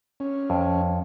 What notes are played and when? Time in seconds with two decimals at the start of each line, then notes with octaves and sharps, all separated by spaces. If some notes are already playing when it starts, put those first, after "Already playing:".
0.20 C#4
0.50 F2